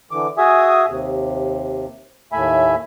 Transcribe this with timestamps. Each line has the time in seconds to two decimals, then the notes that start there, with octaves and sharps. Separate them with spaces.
0.11 D3 E3 D6
0.38 F#4 G#4 E5 G#5 D#6
0.88 D#2 C3
2.32 D#2 A2 A3 E5 G#5 B5